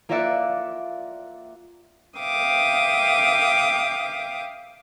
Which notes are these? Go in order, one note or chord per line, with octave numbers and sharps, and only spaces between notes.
A#3 F4 A#4 D5 E5 F#5
E5 F5 G5 D6 D#6